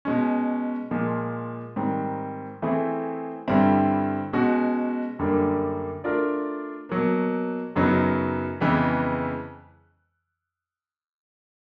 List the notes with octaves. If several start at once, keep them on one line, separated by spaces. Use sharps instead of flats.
B2 G#3 C#4
A#2 F3 G#3
G#2 D#3 G3 C4
E3 A3 C4 E4 G#4
G2 D3 G3 C4 E4
B2 G#3 C#4 F#4
F#2 D3 G3 A#3 D4
A3 D4 F4 A#4 D5
B2 F#3 A#3
F#2 C#3 F#3 B3 D#4
F2 C#3 E3 G#3 B3